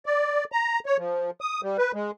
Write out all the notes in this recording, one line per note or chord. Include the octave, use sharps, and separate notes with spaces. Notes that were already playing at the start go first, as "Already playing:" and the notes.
D5
A#5
C#5
F3
D#6
G3
B4
G#3